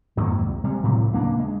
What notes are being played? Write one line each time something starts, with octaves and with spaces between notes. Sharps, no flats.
F2 G#2 D#3 A#3
C2
C3 G3 G#3
A2 C3 F#3
D#1 C#2 A#3 D4
G#3